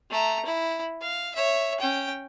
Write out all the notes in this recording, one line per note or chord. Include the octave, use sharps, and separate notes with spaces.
A3 A#5
E4
F5
C#5 E5
C#4 G5